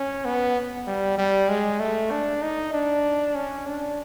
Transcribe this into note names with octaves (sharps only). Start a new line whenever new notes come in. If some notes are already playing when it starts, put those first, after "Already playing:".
Already playing: C#4
B3
G3
G3
G#3
A3
D4
D#4
D4
C#4
D4